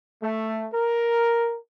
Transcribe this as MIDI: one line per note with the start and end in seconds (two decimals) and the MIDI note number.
0.22 0.66 57
0.73 1.56 70